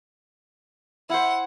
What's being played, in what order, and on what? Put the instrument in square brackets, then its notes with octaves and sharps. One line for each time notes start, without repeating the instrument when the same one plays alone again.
[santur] E4 C5 [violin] F#5